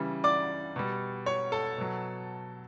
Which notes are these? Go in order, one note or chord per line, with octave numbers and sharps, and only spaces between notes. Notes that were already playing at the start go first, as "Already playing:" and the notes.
Already playing: C#3 E3 G3
D5 D6
B2 G3
C#5 C#6
A4 A5
B2 F#3